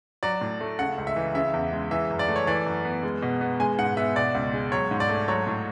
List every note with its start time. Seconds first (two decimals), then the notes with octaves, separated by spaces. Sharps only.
0.23 F#3 D5
0.41 A2
0.61 A3
0.79 C#3 F#5
0.98 C#2
1.07 E5
1.16 E3
1.35 C#3 E5
1.54 E2
1.72 G#3
1.91 E3 E5
2.10 F#2
2.19 D5
2.28 A3
2.36 C#5
2.47 E3 D5
2.66 F#2
2.85 B3
3.03 G#3
3.22 B2
3.41 B3
3.60 G#3 G#5
3.78 G#2 F#5
3.97 B3 E5
4.16 B2 D5
4.35 C#2
4.53 G#3
4.72 F#3 C#5
4.91 G#2
5.00 D5
5.09 A3
5.28 F#3 C#5
5.47 A2